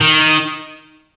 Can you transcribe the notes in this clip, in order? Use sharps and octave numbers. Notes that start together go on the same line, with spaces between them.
D#3